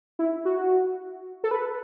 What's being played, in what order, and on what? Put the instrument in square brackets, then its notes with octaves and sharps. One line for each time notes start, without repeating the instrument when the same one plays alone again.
[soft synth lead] E4
F#4
A4
B4